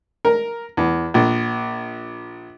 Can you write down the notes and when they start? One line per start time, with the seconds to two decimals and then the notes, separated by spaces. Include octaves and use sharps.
0.25 A#4
0.77 E2
1.14 A#1